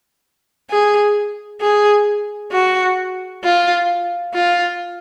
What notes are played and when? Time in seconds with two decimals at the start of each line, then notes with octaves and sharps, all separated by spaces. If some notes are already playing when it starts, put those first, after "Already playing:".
0.70 G#4
1.61 G#4
2.52 F#4
3.44 F4
4.34 F4